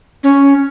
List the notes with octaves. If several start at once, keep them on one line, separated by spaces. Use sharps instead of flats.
C#4